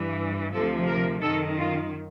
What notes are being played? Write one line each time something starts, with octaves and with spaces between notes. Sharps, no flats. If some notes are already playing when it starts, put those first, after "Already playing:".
Already playing: G2 E3
D2 C3 F3 A4
A#4
F#2 D#3 A4
F4